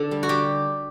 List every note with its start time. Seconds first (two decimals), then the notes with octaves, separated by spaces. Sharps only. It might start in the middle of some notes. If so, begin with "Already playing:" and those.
Already playing: D3 D4 A4
0.11 G3
0.23 F#4
0.29 D3 G4